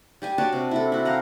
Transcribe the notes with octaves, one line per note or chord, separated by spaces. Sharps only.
G3 G4 G#5
D4 F#4 C#5 A5
C3
E4 A4
E4 F#4
G4 F5 F#5 A#5